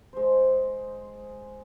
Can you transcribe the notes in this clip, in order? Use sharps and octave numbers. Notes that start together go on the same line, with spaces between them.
G#3 C5